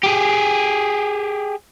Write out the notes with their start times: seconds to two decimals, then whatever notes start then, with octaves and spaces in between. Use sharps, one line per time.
0.03 G4 G#4